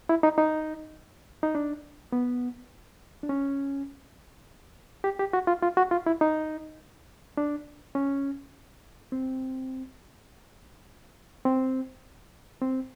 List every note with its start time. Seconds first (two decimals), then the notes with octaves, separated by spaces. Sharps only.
0.09 E4
0.23 D#4
0.38 D#4
1.43 D#4
1.55 D4
2.12 B3
3.23 D4
3.29 C#4
5.04 G4
5.19 G4
5.33 F#4
5.47 F4
5.63 F4
5.77 F#4
5.91 F4
6.06 E4
6.21 D#4
7.37 D4
7.95 C#4
9.12 C4
11.45 C4
12.62 C4